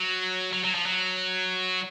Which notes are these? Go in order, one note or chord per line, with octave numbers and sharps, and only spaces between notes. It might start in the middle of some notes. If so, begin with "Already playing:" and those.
Already playing: F#3
F#3
F#3
F3
F#3